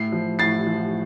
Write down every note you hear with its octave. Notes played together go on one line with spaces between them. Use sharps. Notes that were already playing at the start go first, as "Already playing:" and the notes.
Already playing: A2 C7
F3
A2 A6 C7
F3